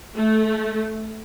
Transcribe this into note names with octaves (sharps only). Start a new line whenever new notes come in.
A3